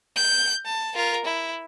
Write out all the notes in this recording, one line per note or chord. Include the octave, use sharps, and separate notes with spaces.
G6
A5
F4 A#4
E4